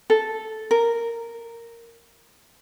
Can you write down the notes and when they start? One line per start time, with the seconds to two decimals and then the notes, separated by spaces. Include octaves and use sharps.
0.10 A4
0.71 A#4